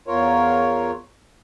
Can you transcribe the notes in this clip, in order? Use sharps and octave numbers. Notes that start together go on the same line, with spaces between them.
E2 F4 A#4 C#5